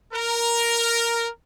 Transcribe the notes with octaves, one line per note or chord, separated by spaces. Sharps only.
A#4